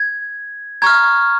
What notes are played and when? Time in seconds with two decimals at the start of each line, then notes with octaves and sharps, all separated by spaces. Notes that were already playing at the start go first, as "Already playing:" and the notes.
Already playing: G#6
0.82 A#5 C#6 F6 G#6